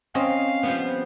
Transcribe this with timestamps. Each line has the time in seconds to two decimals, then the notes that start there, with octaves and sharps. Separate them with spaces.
0.15 C4 C#4 D#5 F5
0.63 F3 G3 B3